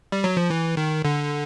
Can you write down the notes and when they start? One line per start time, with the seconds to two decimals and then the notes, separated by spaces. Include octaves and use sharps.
0.12 G3
0.24 F#3
0.37 F3
0.50 E3
0.77 D#3
1.05 D3